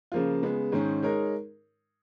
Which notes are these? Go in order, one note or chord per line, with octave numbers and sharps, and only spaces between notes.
C#3 F3 A#3 F4
C#3 G#3 B3
G#2 D#3 G#3 C#4
G#3 D#4 A#4 C#5